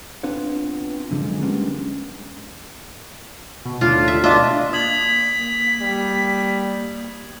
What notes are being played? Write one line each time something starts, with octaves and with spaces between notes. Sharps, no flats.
B3 C4 D4 F4 B4 C#5
F#2 D3 F3 G#3
G3 G#3 A#3 B3 C#4 D4
B2
D#2 A2 D4 F4
E5
B2 D4 F4 D#5 E5 A6
A#3 D#6 G#6 B6 F#7
G3